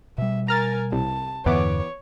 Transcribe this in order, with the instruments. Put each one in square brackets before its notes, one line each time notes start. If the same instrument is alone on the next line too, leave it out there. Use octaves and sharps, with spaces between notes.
[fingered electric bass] B2 G3 [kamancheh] E5
[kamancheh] A#4 G#5 [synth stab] A#5 F6 A6
[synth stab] C2 [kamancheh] A5
[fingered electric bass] E2 G2 D3 [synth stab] E3 B3 D6 [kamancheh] C#5